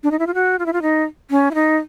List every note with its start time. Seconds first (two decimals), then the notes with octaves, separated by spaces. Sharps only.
0.03 D4
0.11 D#4
0.19 E4
0.27 F4
0.34 F#4
0.59 F4
0.66 E4
0.73 F4
0.82 D#4
1.31 C#4
1.51 E4
1.55 D#4